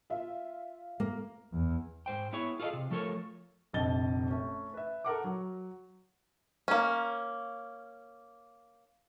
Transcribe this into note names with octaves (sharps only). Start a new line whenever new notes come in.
F4 E5
A#3
E2
G#2 C5 G5
B3 E4 G#4 C#5
F4 G#4 A4 B4 D#5 F5
C3
F3 A3 F4 A4 A#4 C#5
F1 A#1 F2 D#5 A6 G7
A3 C#4
B4 E5
A4 A#4 F#5 D6
F#3
A#3 C#4